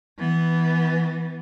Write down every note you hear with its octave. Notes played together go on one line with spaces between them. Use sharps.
E3 B3